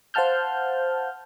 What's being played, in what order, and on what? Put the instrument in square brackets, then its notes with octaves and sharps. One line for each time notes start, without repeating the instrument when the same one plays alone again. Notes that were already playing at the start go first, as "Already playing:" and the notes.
[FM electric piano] C5 F5 F#5 A5 F6 G6